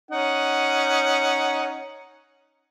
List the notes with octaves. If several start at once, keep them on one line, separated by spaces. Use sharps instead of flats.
C#4 D#4 F#5